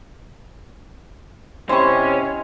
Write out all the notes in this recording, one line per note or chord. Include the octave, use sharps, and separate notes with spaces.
C3 G#3 C4 C#4 E4 C5 C#6